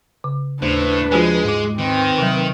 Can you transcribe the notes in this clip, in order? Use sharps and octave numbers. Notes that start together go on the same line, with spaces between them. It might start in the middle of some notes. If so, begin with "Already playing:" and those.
C#3
D#2 A2 D4 B4 C5
F3 G#3 F4 F#4 C5 G#5
G#2 D6
D#3 C4 B4
C3 F#3